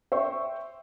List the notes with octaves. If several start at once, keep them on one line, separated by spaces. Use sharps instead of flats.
C5 E5 G5 C#6